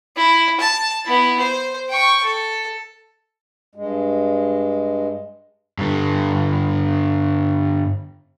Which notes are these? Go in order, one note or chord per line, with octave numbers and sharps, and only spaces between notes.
E4
A5
B3 E4
C5
G5 C#6
A4
G2 G#3
G2 D3